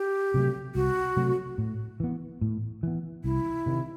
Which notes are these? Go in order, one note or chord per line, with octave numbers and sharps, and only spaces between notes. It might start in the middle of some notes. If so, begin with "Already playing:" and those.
Already playing: G4
C3 F#3 A3
C2 F#4
C3 F#3 A3
A2
E3 B3
A2
E3 B3
C2 E4
C3 D#3